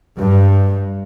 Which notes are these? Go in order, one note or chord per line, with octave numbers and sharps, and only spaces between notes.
G2